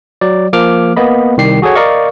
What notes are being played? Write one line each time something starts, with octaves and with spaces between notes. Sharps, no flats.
F#3 D5
F3 A#3 D6 F6
A#3 B3 D#5 B5
C2 D#3 G3 G4 C7
F#4 G#4 A4 C#5 F#5
A#4 D5 D#5 F5 C#6